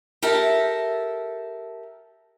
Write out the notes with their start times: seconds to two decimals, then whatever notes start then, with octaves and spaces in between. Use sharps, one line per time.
0.22 G4 A4 A#4 E5 A5